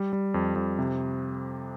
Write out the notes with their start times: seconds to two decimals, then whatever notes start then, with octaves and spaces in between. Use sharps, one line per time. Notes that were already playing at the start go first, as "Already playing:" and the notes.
Already playing: G3
0.13 G3
0.34 F2
0.56 F2
0.79 C3